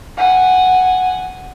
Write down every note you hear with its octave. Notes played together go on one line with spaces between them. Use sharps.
F#5 G#5